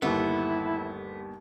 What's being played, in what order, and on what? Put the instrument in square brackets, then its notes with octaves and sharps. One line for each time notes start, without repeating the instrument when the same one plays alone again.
[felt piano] G1 D#2 [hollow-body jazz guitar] A3 B3 [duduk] E4